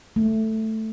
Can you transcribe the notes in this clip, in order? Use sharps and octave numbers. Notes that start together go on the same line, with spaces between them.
A3